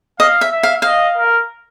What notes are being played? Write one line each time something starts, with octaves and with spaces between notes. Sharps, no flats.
D#5 F5
E5
E5
F5
D#5 F5
A#4